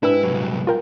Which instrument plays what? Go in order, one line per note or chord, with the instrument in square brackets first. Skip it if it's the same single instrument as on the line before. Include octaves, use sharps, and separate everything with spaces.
[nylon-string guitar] G#2 G4 B4 [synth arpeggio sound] D4 E6 [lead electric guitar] E4
[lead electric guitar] C2 F#3
[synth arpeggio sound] F4 A#4 G5